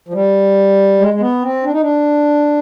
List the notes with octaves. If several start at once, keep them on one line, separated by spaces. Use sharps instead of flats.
F3
G3
G#3
G#3
B3
C4
D4
D#4
D4